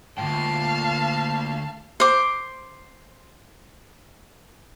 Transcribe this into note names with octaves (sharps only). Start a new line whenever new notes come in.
D2 G#2 A#3 F4 F5 G5 A5
C5 D6